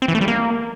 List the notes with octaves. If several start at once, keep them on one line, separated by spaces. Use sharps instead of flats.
C4
E3
A3
G3
A#3